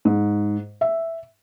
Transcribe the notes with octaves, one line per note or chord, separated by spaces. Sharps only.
G#2
E5